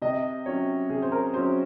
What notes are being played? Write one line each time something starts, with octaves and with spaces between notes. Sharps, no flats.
C3 D#5
F#3 C#4 C#5
C3 G#4
C5
A#4
F#3 C#4 C5